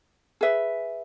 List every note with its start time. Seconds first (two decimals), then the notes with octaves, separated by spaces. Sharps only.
0.41 G#4 B4 E5